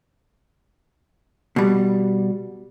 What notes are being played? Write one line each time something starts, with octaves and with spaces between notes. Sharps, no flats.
B2 G3